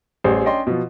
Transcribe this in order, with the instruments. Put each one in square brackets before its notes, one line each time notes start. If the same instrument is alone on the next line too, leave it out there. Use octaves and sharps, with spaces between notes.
[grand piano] A1 G3 G#4 C5
C#4 D4 D5 D#5 G5 C6
B2 F3